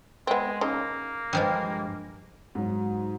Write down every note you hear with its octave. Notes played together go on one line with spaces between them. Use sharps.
G#3 B3 C4
C#3 A#3 D#4
G2 F3 G#3
G#2 F#3